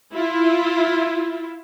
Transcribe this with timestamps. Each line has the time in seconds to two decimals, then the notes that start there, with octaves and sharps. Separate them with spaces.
0.14 E4 F4